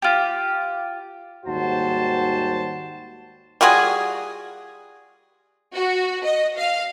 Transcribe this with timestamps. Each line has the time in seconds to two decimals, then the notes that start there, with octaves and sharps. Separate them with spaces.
0.02 F4 G4
1.46 D#2 G#2 G3 F#4 C5 A5
3.61 G3 F4 F#4 G#4
5.74 F#4
6.24 D#5
6.56 F5